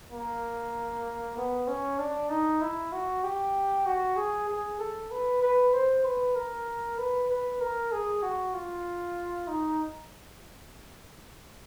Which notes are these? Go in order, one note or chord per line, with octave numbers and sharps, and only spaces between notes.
A#3
B3
C#4
D4
D#4
E4
F#4
G4
F#4
G#4
G#4
A4
B4
B4
C5
B4
A#4
B4
B4
A#4
G#4
F#4
F4
D#4